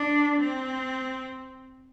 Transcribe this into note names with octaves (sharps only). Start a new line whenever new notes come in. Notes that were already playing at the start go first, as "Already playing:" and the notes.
Already playing: D4
C4